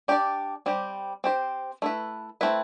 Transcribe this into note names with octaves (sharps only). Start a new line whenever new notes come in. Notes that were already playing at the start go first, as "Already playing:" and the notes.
D4 G4 D5
G3 C4 G4
C4 G4 C5
A3 E4 B4
A3 C4 E4 B4